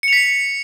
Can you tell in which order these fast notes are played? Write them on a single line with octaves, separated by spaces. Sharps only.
C#7 F7 B6